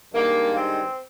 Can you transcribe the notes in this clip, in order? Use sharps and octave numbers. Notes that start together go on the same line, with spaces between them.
G2 D#3 G#3 A#3
C4